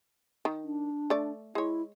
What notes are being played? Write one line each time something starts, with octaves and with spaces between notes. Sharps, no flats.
D#3
D4
A3 D5
G#3 E4 C#5